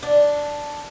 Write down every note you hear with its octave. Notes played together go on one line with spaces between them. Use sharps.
D4